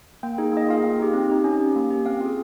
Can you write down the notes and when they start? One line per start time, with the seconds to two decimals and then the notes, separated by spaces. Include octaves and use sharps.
0.23 A#3 G5
0.38 D#4 G#4
0.53 A#3 D#5
0.68 F4 G#4 F5
0.83 A#3 G5
1.00 D#4 G4
1.14 C4
1.29 D#4 G4
1.44 C#4
1.60 G4
1.75 A#3
1.90 C#4 G4
2.06 C4 F5
2.21 F4 G#4